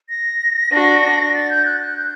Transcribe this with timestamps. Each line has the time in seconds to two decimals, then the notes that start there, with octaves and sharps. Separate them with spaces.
0.09 A#6
0.72 D4 F#4
1.34 A6
1.50 G6
1.66 F#6
1.81 F#6
1.97 G6